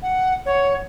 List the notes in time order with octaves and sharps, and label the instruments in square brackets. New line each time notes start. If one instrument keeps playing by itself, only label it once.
[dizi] F#5
[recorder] C#5 [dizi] F#5